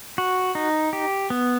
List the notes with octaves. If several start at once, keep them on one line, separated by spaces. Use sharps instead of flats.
F#4
D#4
G4
B3